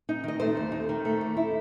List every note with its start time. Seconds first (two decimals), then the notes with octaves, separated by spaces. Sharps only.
0.09 D#4
0.24 D#3 D#5
0.40 A3 C5
0.57 D#2
0.72 D#4
0.89 D#3
1.05 A3
1.21 D#2
1.37 E4